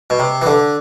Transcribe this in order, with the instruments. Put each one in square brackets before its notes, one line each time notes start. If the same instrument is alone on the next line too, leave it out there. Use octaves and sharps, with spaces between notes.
[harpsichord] B2
C3
E3
D3